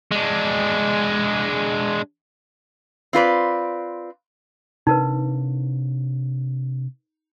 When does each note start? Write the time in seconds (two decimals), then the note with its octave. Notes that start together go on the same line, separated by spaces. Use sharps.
0.11 G#3 D4
3.13 C4 F4 B4 D5
4.87 C3 D4 D#4 A#4 B4